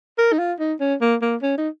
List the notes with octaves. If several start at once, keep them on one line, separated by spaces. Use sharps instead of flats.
A#4
D#4
F4
D#4
C#4
A#3
A#3
C#4
D#4